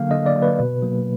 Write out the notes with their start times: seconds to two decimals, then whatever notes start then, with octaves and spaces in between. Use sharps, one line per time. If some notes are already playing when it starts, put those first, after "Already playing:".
Already playing: D3 F#3 A#3 F5
0.10 D3 D#5
0.26 D5
0.35 F#3 A#3
0.42 B4
0.59 B2
0.83 F#3 A#3